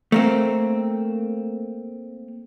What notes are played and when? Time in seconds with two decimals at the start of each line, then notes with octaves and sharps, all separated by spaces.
0.12 A3 A#3 C4